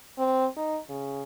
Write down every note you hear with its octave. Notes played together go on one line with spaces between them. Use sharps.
C4
D#4
C#3